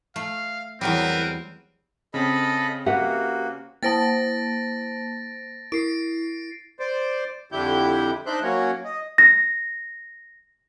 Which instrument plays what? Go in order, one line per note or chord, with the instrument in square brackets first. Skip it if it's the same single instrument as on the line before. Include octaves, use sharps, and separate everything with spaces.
[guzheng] A3 [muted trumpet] F5
[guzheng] E2 F#3 G3 [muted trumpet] C4 [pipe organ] A#4 B4
[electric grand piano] C#3 C4 [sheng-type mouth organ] A4 D#5 B5
[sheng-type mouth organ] A#3 F#4 [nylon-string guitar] G4 [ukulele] B4 E5 F#5
[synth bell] A#3 C5 A5 [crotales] A6 A#6 D7
[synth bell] E4 [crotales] C7 D7
[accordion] C5 D5
F2 D3 G3 E4 G4 G6
D4 D#4 C5 E5 F#6 G6
F#3 A#3 C#4 F#4 C#5
D#5
[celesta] A#6